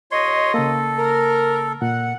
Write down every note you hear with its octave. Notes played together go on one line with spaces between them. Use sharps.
D#2 F4 C#5 D#5 C6
C#3 A#3 A4
A#4
A#2 F#5